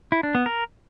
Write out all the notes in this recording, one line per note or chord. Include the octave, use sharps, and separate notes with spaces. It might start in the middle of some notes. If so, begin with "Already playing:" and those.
E4
D4
B3
A#4